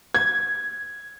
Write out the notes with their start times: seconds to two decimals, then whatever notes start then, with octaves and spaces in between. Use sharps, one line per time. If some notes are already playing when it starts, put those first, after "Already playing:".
0.15 G#6